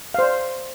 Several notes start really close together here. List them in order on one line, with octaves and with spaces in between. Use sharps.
F5 C5 D5